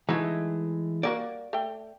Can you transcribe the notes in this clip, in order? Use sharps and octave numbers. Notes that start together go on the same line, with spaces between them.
E3 G#3 A3 D#4 F#4
G3 A#3 F#4 D5
A3 G5